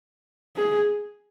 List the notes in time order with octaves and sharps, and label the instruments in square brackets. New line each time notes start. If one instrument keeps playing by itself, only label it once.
[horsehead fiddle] G#4